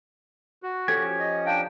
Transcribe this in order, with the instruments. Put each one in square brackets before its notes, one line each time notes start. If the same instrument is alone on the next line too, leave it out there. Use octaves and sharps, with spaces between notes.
[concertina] F#4
[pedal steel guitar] F3 C#4 G4 [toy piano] A4 [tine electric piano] G#6
[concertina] D#5
[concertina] D4 G5 [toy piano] F5 G#5 A#5